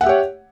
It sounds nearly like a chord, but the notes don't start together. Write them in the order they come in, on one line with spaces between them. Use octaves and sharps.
F#5 E5 G4 C#5